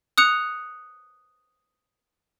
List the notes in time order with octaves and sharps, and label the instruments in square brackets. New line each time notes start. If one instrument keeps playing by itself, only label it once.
[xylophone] D#6 F#6 C#7 F7